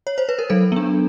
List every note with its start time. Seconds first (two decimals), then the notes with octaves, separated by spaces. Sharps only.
0.07 C#5
0.18 C5
0.29 B4
0.39 A#4
0.50 F#3 A4
0.72 B3 D4